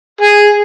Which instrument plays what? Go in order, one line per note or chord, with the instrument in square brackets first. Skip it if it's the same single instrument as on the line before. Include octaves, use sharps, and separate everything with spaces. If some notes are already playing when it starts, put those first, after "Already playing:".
[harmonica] G#4